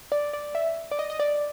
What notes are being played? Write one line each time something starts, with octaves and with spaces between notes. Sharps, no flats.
D5
D5
E5
D5
D#5
D#5
D5